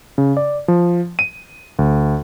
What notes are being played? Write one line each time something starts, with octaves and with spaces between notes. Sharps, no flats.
C#3
D5
F3
D#7
D2